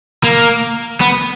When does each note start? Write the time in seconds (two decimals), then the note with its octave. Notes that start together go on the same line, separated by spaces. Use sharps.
0.24 A#3
1.01 B3